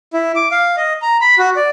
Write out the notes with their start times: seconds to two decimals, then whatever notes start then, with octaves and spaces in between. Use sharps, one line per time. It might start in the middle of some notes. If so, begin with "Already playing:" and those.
0.13 E4
0.35 D6
0.51 F5
0.77 D#5
1.02 A#5
1.21 B5
1.38 F#4
1.56 D5